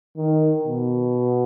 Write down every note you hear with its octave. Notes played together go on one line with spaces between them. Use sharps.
D#3
B2